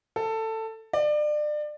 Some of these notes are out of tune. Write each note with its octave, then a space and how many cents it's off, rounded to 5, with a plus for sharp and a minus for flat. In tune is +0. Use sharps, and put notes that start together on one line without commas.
A4 +15
D5 +30